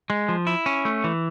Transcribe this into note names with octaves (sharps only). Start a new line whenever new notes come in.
G#3
F3
E4
C#4
A3
E3